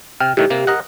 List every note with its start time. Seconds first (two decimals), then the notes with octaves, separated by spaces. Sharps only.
0.20 C3 G5 F6
0.37 A2 D#3 A3 G4
0.50 C3 A#3
0.67 A#4 D#5 F#5